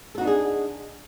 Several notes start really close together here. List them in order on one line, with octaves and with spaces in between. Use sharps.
A4 F#4 D#4 D4 G#4